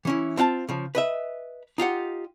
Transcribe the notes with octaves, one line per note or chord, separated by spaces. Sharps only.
E3 C#4 E4
C4 F4 F#5 A5
C#3 F3
B4 D#5 E5
D#4 F4 G4 F#5